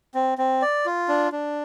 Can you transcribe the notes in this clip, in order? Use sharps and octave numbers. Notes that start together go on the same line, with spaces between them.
C4
C4
D5
F4
D4
D4